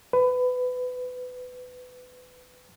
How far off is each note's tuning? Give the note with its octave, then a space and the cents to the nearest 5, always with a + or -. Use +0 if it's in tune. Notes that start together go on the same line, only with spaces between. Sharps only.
B4 +20